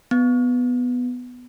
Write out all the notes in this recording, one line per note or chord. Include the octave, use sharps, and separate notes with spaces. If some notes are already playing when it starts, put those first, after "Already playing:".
B3